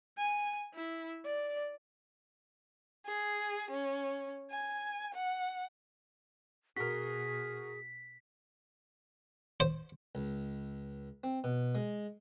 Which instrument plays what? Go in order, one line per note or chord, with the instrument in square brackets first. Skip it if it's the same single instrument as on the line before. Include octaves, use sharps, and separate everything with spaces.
[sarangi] G#5
E4
D5
[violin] G#4
C#4
G#5
F#5
[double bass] B2 [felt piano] F#4 A#4 [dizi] G#4 [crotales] B6
[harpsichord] C5
C#2
C4
B2
G#3